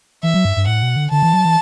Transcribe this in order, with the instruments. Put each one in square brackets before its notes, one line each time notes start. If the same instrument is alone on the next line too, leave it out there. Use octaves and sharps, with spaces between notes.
[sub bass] E3 [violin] E5
[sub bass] F#3
G2
G2
[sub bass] A2 [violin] F#5
[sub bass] B2
D3
[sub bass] D3 [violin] A5
[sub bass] E3
F#3
E3